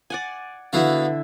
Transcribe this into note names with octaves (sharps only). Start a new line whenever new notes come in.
D5 F#5 G#5
D3 B3 E4 F#4 E5 F5